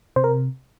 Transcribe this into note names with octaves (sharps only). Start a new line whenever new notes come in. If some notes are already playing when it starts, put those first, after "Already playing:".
C3 C5
A#4